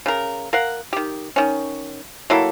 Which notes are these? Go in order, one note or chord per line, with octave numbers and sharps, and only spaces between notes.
C#3 A#4
A#4 F5 F#5
D#3 G4
D#3 C#4
F#3 A#3 E4 A4